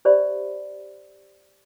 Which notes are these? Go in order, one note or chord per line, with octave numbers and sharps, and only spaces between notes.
G4 C5 D5 E5 B5